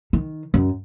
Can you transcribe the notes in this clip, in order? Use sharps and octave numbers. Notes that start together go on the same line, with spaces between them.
D#3
F#2